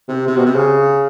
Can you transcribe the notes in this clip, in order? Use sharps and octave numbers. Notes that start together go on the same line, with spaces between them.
C3
C3
B2
C3
C#3